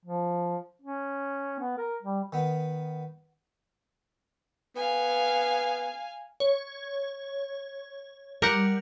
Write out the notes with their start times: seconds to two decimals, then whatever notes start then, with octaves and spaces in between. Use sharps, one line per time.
0.05 F3
0.82 C#4
1.59 B3
1.78 A#4
2.02 G3
2.33 D#3 B3
4.76 B3 F5 G#5
6.40 C#5
8.42 G3 A#4 F#5